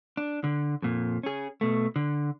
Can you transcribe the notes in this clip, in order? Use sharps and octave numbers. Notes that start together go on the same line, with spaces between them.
D4
D3
F2 A#2
C#4 G#4
B2 A3
D3